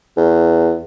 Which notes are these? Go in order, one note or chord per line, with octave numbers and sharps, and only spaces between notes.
E2